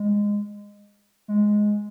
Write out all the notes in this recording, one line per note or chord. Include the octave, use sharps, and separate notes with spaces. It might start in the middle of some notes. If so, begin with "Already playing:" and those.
Already playing: G#3
G#3